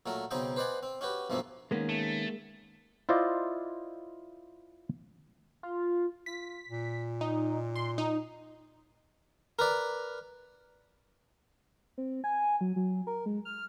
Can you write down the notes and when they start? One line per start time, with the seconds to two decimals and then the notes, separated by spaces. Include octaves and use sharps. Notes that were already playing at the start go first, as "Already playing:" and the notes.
0.06 A#2 F#3 A3 A#4
0.31 B1 C#3 C4 D#4 D#5 G5
0.56 B4 C5 D5 D#5 F#5 G#5
0.83 C4
1.01 C#4 F#4 G4 B4
1.30 B1 G2 F3 A3 A#3 C4
1.71 D#3 G#3 A#3 B3 C#4
1.89 A3
3.09 E4 F4 C5 D5 D#5
5.63 F4
6.26 F4 B6
6.69 A#2
7.21 D#4
7.76 C6
7.98 D#4
9.59 A#4 B4 D5
11.98 C4
12.24 G#5
12.61 F#3
12.76 F#3
13.07 A#4
13.26 G#3
13.45 F6